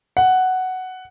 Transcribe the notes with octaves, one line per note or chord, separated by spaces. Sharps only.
F#5